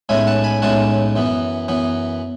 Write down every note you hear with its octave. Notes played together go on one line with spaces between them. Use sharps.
B1 A2 G#3 C#4 E4 E5 G#5
F#5 A5
G#5 B5
B1 A2 G#3 C#4 E4 F#5 A5
F#2 E3 B3
F#2 E3 B3